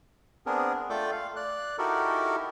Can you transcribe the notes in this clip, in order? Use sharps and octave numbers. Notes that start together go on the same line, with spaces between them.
B3 C4 D4 G#4 A#4
A3 F4 A4 D5 G5 D6
F5
D5 F#6
D#4 E4 F#4 G4 A4 A#4